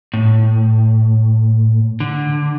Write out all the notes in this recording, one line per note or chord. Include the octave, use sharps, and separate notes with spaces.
A2
D3